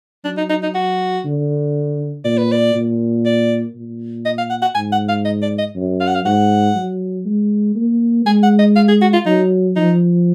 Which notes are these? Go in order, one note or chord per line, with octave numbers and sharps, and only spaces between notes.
F#3 D4
D#4
D#4
D#4
F#4
D3
A#2 D5
B4
D5
A#2
D5
A#2
D#5
F5
F#5
F#5
G#2 G#5
F#5
F5
D#5
D5
D#5
F#2
F5
F#5
F5
G#2 F#5
F#3
G#3
A#3
G#3 G#5
F#5
D#5
F5
G#4
F#4
F4
F#3 D#4
F3 D#4